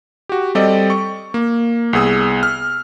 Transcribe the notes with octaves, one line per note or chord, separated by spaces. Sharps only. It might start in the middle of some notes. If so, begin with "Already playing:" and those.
F#4 G4
G3 C4 G4 A4 D5 D#5
C#6
A#3
C2 B3 G#4 D#6 E6
F6